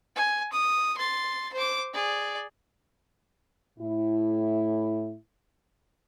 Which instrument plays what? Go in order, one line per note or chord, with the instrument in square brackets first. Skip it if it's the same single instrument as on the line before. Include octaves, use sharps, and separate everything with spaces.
[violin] G#5
D#6
C6 A6
C5 D6
G#4 D5
[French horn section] A2 E4